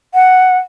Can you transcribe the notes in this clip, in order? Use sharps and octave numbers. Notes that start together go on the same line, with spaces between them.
F#5